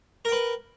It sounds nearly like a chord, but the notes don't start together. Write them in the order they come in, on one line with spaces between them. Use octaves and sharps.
A#4 G5 B4